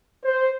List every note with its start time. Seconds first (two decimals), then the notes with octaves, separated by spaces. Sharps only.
0.24 C5